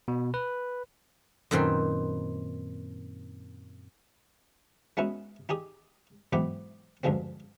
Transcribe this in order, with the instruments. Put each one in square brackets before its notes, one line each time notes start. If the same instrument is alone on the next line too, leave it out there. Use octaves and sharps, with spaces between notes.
[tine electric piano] B2
B4
[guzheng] F#2 A#2 D#3 C4 B4 C6
[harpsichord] G#3 B3 C#4 D#4 E4 F#4
D#4 G4 G#4 D#6
B1 G#2 E3 B3 G5 D6
D2 G2 D3 F3 G#3 C4